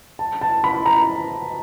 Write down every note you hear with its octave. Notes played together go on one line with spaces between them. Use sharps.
A5
A5
B5
A#5